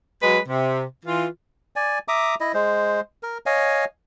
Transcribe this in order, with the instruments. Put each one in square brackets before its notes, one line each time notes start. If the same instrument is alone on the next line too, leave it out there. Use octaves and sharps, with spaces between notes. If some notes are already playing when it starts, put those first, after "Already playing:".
[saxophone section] F#3 G#3 B4
C3
E3 F4
[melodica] D5 G#5
E5 A#5 D6 D#6
E4 D#5
G#3 C5
A#4
C#5 D#5 F5 G#5